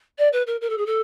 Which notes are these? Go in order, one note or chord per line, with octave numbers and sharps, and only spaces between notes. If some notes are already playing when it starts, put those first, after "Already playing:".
D5
B4
A#4
A#4
A4
G#4
A4